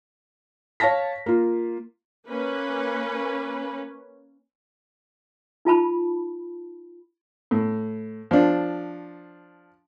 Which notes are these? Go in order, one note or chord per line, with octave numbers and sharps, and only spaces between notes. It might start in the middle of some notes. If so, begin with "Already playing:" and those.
C#5 F5 A5 A#6 B6
A#3 F4
A#3 C#4 B4
D#4 F4 A5 B5
A2
F3 D4